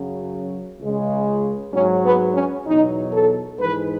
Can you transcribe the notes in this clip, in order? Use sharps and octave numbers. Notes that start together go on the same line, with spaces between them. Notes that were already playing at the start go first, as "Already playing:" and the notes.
Already playing: F#2 C#3 F#3
C#2 C#3 G#3
G#2 F#3 C#4
B3
C#4
E2 B2 F#3 D#4
A4
G#2 E3 G#3 B4